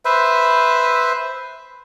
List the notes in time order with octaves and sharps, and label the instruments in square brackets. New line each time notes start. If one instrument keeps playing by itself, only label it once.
[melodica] B4 C5 E5